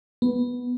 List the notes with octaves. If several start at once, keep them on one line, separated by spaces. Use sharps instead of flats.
B3